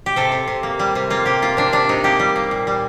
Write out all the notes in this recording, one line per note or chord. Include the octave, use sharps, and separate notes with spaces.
G4
C3 A4
C3
C3
A#3
G3
C3
A#3 F4
C3 G4
A#3 F4
C3 D4
C3 D4
C3 D#4
A#3 G4
G3
A#3
A#2
G3